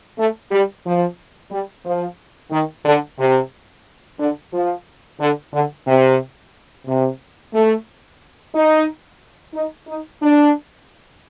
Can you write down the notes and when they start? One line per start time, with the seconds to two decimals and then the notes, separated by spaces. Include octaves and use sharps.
0.18 A3
0.51 G3
0.85 F3
1.52 G3
1.85 F3
2.52 D#3
2.85 D3
3.19 C3
4.19 D3
4.53 F3
5.20 D3
5.53 D3
5.87 C3
6.87 C3
7.54 A3
8.55 D#4
9.55 D#4
9.88 D#4
10.22 D4